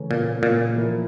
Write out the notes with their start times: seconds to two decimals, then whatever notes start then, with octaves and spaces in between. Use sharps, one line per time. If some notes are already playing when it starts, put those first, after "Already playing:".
Already playing: C#3 E3 A3 C#4
0.11 A#2
0.43 A#2
0.76 F3 A#3 E4